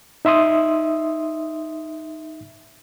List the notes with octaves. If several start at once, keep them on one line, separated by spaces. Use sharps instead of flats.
D#4 E5 C6 D#6